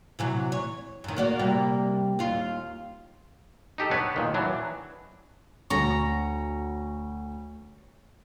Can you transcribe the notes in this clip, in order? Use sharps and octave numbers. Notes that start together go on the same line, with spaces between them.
C3 E3 F#3
C#5
F#2 D#3
A#3 F#4 D5
C3 G3 A#3
D#2 F4
D#4 G4 A4
B3 D4 B4 C#5
A#2 D#3
E3 F#3 D4
D2 C#5 A#5